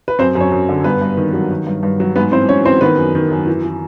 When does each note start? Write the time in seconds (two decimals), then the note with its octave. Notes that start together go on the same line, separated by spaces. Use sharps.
0.08 B4
0.19 F#2 C4 C5
0.35 F#2
0.40 C#4 C#5
0.52 F#2
0.69 D3
0.84 G2 B3 B4
1.01 G2
1.17 D#3
1.33 F#3
1.51 D#3
1.66 G2
1.83 G2
2.00 F#3
2.16 G#2 B3 B4
2.32 E3 C4 C5
2.48 G#2 C#4 C#5
2.65 E3 C4 C5
2.81 D#3 B3 B4
2.97 F#2
3.15 D#3
3.31 F#2
3.47 E3
3.64 E3